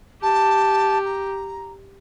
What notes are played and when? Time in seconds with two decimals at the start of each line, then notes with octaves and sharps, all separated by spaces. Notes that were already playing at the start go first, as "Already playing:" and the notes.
0.22 G4 A5
1.05 A#5